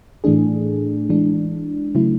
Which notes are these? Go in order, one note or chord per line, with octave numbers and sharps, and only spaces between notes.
A2 E3 A3 D4 G#4
E3 G#3 D4
C#3 F#3 A3 E4